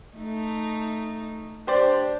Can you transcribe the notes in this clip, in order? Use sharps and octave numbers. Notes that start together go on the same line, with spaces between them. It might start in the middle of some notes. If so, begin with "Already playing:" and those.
A3 D#4
D4 G4 C5 D5